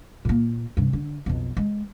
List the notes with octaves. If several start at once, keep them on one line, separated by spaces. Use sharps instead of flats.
A#2 A#3
G2 C3
D3
B1 F2
G#3